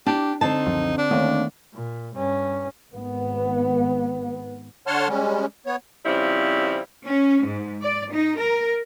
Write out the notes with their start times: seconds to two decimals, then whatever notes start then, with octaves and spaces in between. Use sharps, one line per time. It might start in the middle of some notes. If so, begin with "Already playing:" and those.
0.06 D4 G4
0.41 D3 C4 D#4 C5 A5
0.66 C#2 F#2 F3
0.98 D4
1.11 D#2 D#3 A3 B3
1.74 A#2
2.15 G2 C#4
2.92 G#1 B3
4.87 D3 C#5 F#5 A5 C6 F6
5.08 G3 G#3 C#4
5.66 B3 C#5
6.05 C#3 F3 G3 C4 E4
7.05 C#4
7.45 G#2
7.83 D5
8.12 D#4
8.41 A#4